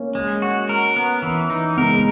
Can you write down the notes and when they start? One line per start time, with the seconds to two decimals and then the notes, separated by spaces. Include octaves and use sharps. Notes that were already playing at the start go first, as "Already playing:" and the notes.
Already playing: A#3 C#4
0.15 G#3
0.42 F#4
0.69 A#4
0.96 B3
1.22 E3
1.50 D#4
1.77 G#3 B3 A#4
1.94 G#3